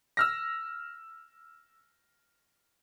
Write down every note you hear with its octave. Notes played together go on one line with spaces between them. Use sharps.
E6 F6 A#6